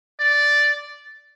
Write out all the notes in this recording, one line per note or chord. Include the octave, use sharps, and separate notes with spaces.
D5